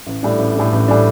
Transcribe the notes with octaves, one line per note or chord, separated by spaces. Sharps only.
A1
A2 G3 D4
A1
A2 G3 D4
A1
A2 G3 D4